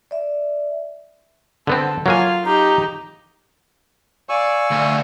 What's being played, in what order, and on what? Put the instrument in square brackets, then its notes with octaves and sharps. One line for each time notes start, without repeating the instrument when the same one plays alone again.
[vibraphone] D5 E5
[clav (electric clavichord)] D3 B3 C4 [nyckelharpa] A4
[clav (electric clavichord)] F#3 A#3 G#5 [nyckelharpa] F4 F5
[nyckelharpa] D#4 G4 [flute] A#5
[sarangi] D5 [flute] F5 [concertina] G#5 C#6 E6
[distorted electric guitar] D2